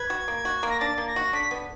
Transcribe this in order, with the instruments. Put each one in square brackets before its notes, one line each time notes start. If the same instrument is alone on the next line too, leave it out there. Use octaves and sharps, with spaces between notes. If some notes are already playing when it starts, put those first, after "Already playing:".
Already playing: [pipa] B4 [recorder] G#6
[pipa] F#4
A#3
F#4
A#3
[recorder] A#6
[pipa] D4 [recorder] A6
[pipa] A#3
[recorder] A#6
[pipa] F#4
[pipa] D3 [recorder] B6
[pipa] B3